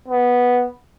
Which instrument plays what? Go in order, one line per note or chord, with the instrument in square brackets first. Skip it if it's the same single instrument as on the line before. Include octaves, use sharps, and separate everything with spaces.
[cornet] B3